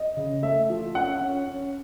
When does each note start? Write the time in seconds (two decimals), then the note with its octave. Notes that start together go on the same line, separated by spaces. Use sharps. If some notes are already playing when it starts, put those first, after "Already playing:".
Already playing: D#5
0.17 C#3
0.42 A3 E5
0.70 F3
0.95 C#4 F#5
1.21 C#4
1.48 C#4